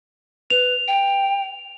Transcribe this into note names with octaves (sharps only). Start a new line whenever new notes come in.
B4 F7
G5